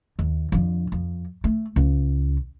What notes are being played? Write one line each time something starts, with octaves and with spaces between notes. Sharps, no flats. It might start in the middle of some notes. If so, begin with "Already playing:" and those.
D#2
F2 D3
F2
A3
C#2